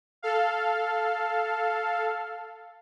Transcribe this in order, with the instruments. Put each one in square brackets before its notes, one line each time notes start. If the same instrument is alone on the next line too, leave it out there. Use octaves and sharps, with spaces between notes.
[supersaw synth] A4 F5